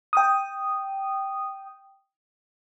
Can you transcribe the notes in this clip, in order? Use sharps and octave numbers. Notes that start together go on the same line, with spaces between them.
G5 D#6